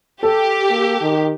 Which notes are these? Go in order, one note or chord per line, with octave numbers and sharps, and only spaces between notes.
G4 A4
A#3
D#3